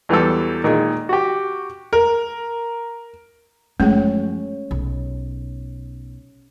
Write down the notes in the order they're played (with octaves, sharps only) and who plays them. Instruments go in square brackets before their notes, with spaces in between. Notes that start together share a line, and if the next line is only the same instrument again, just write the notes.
[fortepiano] E2 E3 F#3 G3 A4
A#2 D#3 G#3
F#4 G4
[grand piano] A#4
[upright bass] F#2 F3 [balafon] G#3 A3 G#4 [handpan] C#4
[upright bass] B1